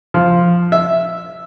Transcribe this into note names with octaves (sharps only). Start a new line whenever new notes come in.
F3
E5